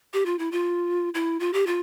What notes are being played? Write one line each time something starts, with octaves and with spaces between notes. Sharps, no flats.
G4
F4
E4
F4
E4
F4
G4
F4